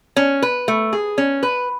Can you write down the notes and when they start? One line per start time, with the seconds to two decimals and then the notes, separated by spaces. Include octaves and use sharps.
0.16 C#4
0.42 B4
0.68 A3
0.93 G#4
1.18 C#4
1.43 B4